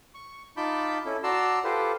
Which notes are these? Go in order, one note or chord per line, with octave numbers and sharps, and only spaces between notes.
C#6
D#4 F4 A5 B5 D6 G6
C#4 E4 A4
F#4 D5 A5 A#5 C6 E6
F4 G4 A4 B4 C5